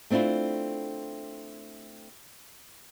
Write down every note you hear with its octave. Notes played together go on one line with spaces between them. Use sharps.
A3 C4 D4 E4 F4